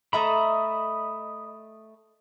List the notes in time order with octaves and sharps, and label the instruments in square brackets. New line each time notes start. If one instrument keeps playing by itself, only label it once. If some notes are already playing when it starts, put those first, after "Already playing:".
[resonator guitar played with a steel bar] A3 E5 A#5 [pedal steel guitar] D#5 B5